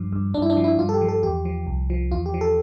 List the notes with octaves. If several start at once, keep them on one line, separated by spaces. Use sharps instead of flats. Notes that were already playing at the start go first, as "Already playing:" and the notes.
Already playing: G2 F3
G2
G2 D4
E4
D4
F3
E4
G2 F4
A4
G4
F3
A4
E2 G4
F3
C2
F3
E2 F4
G4
F3
A4